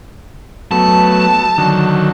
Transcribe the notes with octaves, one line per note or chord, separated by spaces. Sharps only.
F#3 A3 B3 A5
D3 D#3 F#3